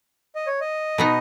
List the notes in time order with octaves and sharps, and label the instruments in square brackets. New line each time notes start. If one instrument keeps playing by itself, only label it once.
[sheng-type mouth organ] D#5
C#5
D#5
[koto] B2 B3 D#4